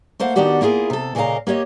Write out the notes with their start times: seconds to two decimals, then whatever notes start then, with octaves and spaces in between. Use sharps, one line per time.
0.20 A3 A#3 C5 F5 F#5
0.36 D#3 B3 D4 F#4 G4 D5
0.61 A#3 E4 F4 G#4 A#4
0.90 C3 A4
1.15 A#2 C#3 A#4 D#5 F5 A#5
1.47 A#3 G4 C#5 D#5